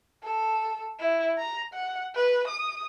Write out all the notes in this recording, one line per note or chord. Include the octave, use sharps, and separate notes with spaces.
A4
E4
A#5
F#5
B4
D#6